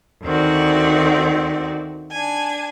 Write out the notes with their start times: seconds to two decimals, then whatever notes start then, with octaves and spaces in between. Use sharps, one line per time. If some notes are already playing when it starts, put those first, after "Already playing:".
0.23 D2 D#3 C4 F#4 D5
2.11 D4 G#5